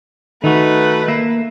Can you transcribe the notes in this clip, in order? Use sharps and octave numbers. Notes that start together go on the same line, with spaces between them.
D#3 A3 D#4 F#4 B4
A#3 E5